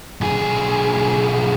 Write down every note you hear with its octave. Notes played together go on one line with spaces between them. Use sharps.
B1 G#4